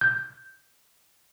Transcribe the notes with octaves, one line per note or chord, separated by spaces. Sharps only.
G6